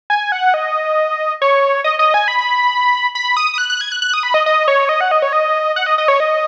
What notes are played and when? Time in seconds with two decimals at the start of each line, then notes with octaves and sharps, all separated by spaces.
0.10 G#5
0.32 F#5
0.54 D#5
1.42 C#5
1.84 D#5
1.99 D#5
2.14 G#5
2.28 B5
3.15 B5
3.37 D#6
3.54 D#6
3.58 F#6
3.70 F#6
3.81 G#6
3.92 F#6
4.02 F#6
4.14 D#6
4.23 B5
4.34 D#5
4.46 D#5
4.68 C#5
4.89 D#5
5.01 F#5
5.11 D#5
5.22 C#5
5.33 D#5
5.76 F#5
5.86 D#5
5.98 D#5
6.08 C#5
6.20 D#5